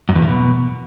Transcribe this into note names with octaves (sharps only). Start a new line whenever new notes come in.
F#2
E2
A#2
B2